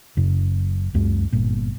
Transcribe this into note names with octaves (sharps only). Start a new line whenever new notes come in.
F#1 F#2 C#3
C#2 F#2 G#3
G1 A#2